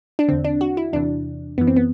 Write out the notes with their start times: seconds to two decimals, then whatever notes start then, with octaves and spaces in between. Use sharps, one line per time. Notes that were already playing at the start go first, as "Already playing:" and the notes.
0.19 D4
0.28 E2 D3 C4
0.44 D4
0.61 F#4
0.77 E4
0.93 E2 C3 E3 D4
1.58 F#2 E3 B3
1.67 C4
1.76 B3